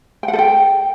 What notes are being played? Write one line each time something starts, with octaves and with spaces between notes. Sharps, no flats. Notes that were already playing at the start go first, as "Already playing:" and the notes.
G5
F#5
A4
G5